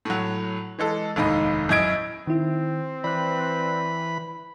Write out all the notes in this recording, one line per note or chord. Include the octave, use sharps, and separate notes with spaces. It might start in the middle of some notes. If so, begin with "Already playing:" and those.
A2 F#3
E3 G#3 A4
F1 D#2 G#2 D#5 B5
F#2 E4 D#5 G#6 D7
D#3 C4 E4
E3 B4 D5 B5 F#6